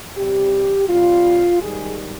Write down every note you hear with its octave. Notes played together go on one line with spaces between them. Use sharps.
C3 G3 G4
C3 G3 F4
G#2 D#3 G3 G#4